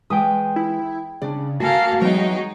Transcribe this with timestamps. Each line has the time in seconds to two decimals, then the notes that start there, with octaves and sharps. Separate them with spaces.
0.10 E3 G#3 B4 G5 D#6
0.56 E4
1.22 C#3 D4 D5
1.60 A#3 F#4 A4 F5 F#5 G#5 A5
2.01 E3 F#3 G#3 B3 D#4 G5